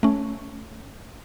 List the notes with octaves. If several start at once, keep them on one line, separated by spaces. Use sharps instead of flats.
A3 C#4